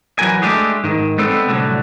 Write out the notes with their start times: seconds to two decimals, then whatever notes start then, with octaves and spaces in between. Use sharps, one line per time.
0.19 E3 F#3 F#4 A#4 G#5
0.42 G#3 A3 C#4 D4 G4 G#4
0.84 G#2 D#3
1.18 G3 G#3 B3 C4 A4
1.48 C2 A2 D3 F#3